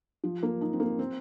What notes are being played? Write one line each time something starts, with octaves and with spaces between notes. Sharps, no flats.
F3
A#3
D#4
C4
A#3
C4